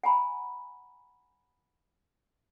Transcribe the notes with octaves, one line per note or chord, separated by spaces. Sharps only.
F#5 G#5 A#5 B5